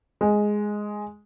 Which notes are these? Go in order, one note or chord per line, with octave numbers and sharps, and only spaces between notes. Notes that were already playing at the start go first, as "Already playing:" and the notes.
G#3